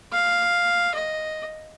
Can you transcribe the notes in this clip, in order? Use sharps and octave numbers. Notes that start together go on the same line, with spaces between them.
F5
D#5